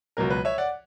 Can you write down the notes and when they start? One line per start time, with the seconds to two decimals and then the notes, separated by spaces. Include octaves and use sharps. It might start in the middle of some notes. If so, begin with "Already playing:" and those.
0.17 C#2 B2 F#3 A#4
0.30 B4
0.45 C#5 E5
0.58 D5 F#5